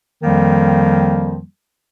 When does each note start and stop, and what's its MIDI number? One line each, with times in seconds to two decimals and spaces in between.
0.23 1.41 41
0.23 1.41 51
0.23 1.41 53
0.23 1.41 55
0.23 1.41 58